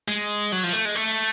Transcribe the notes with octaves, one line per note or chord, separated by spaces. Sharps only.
G#3
F#3
F3
A3
G#3
A3